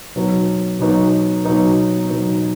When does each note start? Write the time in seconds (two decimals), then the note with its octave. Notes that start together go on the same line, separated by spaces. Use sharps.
0.16 B2 F#3 D#4 B4
0.79 B2 F#3 D#4 B4
1.45 B2 F#3 D#4 B4
2.10 B2 F#3 D#4 B4